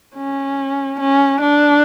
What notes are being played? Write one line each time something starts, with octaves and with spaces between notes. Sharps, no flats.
C#4
C#4
D4